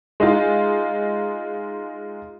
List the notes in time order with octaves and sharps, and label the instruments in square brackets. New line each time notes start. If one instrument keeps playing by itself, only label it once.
[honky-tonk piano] G#3 D#4 F4